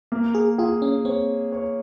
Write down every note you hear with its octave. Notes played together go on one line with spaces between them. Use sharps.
A#3
G#4
F4 G#4
C#4
C4 C#5
C#5